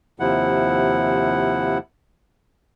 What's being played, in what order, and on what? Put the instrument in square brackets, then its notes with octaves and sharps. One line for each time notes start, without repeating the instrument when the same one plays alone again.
[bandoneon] D#2 C3 F3 E4 F#5